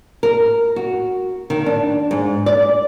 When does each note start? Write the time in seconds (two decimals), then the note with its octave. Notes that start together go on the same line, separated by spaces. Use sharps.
0.23 A#4
0.76 F#4
1.50 D#3
1.66 D4
2.11 G#2
2.46 D5